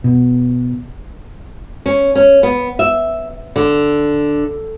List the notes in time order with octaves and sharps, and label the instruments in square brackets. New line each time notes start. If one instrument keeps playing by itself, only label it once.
[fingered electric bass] B2
[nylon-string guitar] C#4
C#4
B3
E5
D3